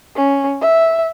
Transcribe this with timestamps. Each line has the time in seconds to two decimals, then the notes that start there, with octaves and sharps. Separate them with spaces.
0.16 C#4
0.61 E5